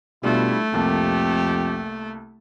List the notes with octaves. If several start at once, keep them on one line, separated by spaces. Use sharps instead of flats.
B2 G3 A3 D4 E4 F4
C2 F2 A#3 G4 A5